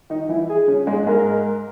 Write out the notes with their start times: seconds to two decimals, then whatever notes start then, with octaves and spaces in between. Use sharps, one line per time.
0.10 D#3 D#4
0.29 E3 E4
0.49 G#4
0.68 C#3 C#4
0.87 G#2 G#3
1.07 G#2 G#3 A#4